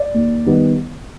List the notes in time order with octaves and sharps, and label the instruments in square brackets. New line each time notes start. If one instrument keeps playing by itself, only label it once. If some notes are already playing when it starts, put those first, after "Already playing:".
Already playing: [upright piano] D5
D#2
D#3 G3 B3